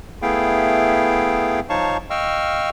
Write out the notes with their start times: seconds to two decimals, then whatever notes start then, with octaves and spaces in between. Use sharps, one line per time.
0.22 A3 B3 E4 G#4 F5 G5
1.69 F3 D#4 C#5 F5 A5 C#6
2.10 D#5 F5 G5 C#6 E6 F6